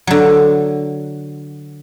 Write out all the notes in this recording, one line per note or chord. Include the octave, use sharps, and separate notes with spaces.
D3 F#3